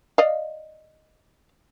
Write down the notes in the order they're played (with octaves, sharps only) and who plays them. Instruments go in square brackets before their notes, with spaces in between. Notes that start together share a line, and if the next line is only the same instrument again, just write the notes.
[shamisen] D5 D#5 F5